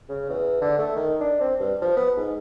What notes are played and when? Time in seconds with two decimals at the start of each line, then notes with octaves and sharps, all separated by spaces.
0.09 C#3
0.29 E2
0.61 D3
0.78 A3
0.96 D#3
1.20 D4
1.40 C4
1.60 G2
1.81 F3
1.97 B3
2.17 G#2